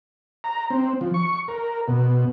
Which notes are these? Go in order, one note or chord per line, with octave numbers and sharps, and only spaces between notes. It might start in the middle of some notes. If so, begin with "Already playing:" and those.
A#5
C4
F3
C#6
A#4
B2